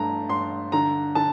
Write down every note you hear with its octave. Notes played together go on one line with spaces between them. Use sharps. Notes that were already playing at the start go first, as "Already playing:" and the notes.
Already playing: G2 A3 A5 A#5
G2 C6
D3 A#5
D3 A5